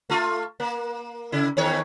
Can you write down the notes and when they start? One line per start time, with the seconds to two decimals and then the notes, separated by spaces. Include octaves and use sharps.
0.10 A3 F4
0.60 A#3
1.32 C#3 E4
1.57 E2 D#3 C#5